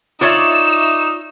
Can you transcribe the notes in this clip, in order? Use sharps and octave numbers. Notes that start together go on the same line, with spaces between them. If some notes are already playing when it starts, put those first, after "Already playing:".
D#4 F4 C#5 D5 E5 C#6 D6 E6